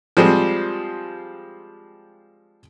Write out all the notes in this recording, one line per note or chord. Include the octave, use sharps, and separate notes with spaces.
F3 G3 G#3 C4